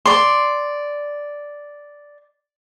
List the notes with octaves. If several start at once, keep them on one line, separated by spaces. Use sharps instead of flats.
D5 C6